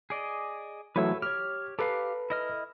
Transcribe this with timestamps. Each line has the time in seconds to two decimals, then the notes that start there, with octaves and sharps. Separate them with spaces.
0.10 G#4 D5 D#5
0.96 E3 F#3 A3 B4 C#5 E6
1.22 G4 C#5 F6
1.79 G4 A4 B4 F5
2.30 E4 D#5 F6